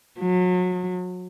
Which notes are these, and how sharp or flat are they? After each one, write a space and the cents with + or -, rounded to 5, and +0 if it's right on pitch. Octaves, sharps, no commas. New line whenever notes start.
F#3 -30